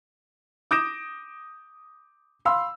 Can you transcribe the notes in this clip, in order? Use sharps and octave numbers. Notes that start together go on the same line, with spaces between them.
D6 D#6 G6 A#6 D7 E7
F5 B5 C6 E6